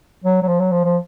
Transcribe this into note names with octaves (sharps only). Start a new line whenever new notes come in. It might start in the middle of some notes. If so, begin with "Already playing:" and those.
F#3
F#3
F3
F#3
F3
F3